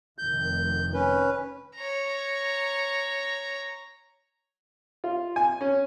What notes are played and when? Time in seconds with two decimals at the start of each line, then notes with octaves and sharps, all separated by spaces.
0.18 F1 D#3 G6
0.93 C#4 B4
1.75 C#5 A#5
5.04 F4
5.36 G#5
5.61 C#4